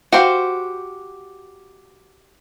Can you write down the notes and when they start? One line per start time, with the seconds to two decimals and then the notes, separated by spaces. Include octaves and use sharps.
0.13 F#4 G4 C5 F5